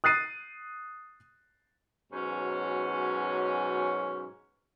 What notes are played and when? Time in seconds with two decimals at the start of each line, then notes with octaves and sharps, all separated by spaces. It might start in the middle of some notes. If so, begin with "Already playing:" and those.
0.04 D#6 F#6 A6 C7 D#7
2.13 G#2 B2 F#3 C#4